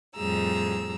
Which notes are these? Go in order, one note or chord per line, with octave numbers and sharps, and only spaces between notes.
F2 A2 G3 G#4 A#5 E6